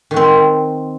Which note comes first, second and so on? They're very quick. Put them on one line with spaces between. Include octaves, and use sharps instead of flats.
D#3 F#4 C4